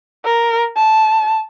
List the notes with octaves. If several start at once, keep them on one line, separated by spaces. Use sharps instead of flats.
A#4
A5